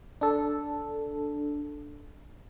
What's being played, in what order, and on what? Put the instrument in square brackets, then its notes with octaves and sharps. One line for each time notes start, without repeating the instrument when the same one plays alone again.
[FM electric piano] D4 A4